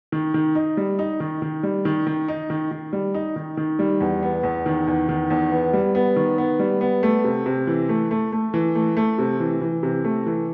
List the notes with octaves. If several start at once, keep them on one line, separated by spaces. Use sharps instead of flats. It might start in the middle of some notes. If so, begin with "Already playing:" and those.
D#3
D#3
D#4
G3
D#4
D#3
D#3
G3
D#3
D#3
D#4
D#3
D#3
G3
D#4
D#3
D#3
G3
E2
B3
E2
D#3
E2
D#3
E2
B3
G3
B3
D#3
B3
G3
B3
A3
C3
C3
E3
A3
A3
A3
E3
A3
A3
C3
E3
E3
C3
A3
E3